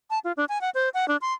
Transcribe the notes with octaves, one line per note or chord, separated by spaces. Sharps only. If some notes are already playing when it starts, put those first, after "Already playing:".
A5
F4
D4
G#5
F#5
C5
F#5
D4
C6